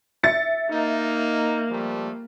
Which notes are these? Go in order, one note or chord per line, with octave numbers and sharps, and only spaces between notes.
E5 A6 C#7
A#3 D#4
F3 G3 A3